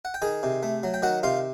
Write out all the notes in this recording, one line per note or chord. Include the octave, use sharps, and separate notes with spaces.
F#5
G5
D#3 G#4 G#5
C3
A3
F#3
G5
D#3 F#4 F#5
C3 F4 F5